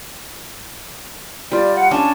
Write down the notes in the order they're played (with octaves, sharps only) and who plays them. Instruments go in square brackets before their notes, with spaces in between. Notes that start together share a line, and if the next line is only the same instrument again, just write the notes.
[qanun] G3 F4 [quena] D5
[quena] F#5
[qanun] C#4 D4 C#5 [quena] A5